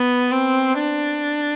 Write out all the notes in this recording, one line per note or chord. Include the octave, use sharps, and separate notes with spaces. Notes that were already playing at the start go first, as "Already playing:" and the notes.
Already playing: B3
C4
D4